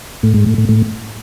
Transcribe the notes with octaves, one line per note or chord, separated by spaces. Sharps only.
A2
G#2
A2
A2
A2